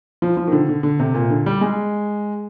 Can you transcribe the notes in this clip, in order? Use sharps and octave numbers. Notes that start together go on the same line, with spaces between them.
F3
F3
D#3
D3
D3
D3
C3
A#2
D3
G3
G#3